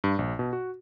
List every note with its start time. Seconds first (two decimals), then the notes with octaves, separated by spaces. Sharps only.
0.04 G2
0.19 A#1
0.39 B2
0.53 F#4